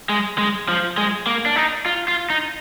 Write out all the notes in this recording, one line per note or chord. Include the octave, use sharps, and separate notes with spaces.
G#3
G#3
F3
G#3
A#3
D4
D#4
F4
F4
D#4